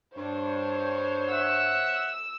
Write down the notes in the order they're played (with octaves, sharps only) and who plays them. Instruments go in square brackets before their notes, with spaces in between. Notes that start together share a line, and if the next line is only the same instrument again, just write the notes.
[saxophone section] G2 [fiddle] D4 [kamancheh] C5 C#5
[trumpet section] E5 F#5 [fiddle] E6